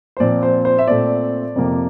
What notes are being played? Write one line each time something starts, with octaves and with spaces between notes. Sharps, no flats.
C5
A#2 F3 C4 D5
C5
C5
E5
A#2 A3 C4 D5
F2 C3 F3 A#3